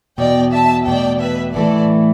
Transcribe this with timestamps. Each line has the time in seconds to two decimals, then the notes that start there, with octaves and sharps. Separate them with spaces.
0.18 E2 B2 B3 D5 G5
0.51 E5 A5
0.86 E2 B2 A3 D5 G5
1.20 B4 E5
1.54 A2 E3 A3 A4 D5